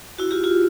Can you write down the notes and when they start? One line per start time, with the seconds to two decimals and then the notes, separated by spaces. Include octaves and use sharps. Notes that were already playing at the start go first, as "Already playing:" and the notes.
0.18 E4 F#4
0.31 F4 G4
0.44 F4 G4